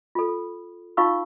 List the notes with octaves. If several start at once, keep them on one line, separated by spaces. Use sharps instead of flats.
F4 A4
D#4 F4 F5 C#6 E6